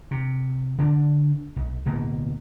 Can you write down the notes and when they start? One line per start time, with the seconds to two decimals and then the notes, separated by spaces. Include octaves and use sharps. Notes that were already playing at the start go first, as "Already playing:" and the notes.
0.11 C3
0.78 D3 D4
1.56 B1
1.85 D1 B2 A#3